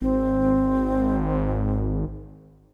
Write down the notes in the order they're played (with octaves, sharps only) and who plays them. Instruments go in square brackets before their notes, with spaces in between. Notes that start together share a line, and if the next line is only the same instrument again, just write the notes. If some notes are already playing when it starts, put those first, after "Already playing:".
[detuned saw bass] G#1 [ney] C4